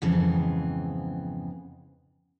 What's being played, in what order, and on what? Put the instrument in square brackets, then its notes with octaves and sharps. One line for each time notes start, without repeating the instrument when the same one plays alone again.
[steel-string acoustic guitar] F2 G#2 C#3 E3 B3 C4